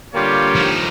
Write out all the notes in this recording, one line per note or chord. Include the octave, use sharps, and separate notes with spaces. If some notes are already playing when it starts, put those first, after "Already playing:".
D3 G3 A#3 F4 G4 C#5
F3 D#4